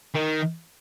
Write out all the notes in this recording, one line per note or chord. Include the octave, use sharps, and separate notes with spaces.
D#3